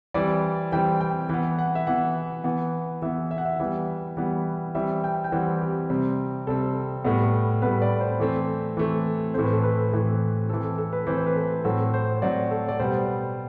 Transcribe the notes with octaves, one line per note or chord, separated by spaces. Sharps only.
E3 G3 C4 D5
E3 G3 C4 G5
G5
E3 B3
F#5
E5
E3 B3 F#5
E3 B3
E3 B3 E5
E5
F#5
E5
E3 G3 B3
E3 G3 B3
E3 G3 C4 E5
G5
G5
E3 G3 C4 F#5
G4
C3 G3 C4
C3 G3 C4 A4
A2 G3 B3
A2 G3 B3 B4
D5
C5
E3 A3 C4
E3 A3 C4
A2 E3 A3 C4 C5
B4
A4
B4
A2 E3 A3 C4
E3 A3 C4 A4
A4
A4
B4
E3 A3 C4 C5
C5
B4
A4
A2 F#3 C4 A4
C5
A2 F#3 C4 D5
A4
D5
B2 G3 B3 C5